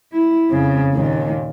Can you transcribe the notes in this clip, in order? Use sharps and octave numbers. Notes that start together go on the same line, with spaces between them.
E4
F2 C#3
D#2 A#2